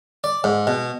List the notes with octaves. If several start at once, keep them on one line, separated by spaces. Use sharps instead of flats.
D5
G#2
B2